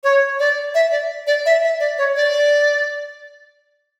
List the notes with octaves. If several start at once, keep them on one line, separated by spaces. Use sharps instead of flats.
C#5
D5
E5
D5
D5
E5
E5
D5
C#5
D5